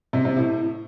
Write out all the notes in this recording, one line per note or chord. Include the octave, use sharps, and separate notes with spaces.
C3
C3
A2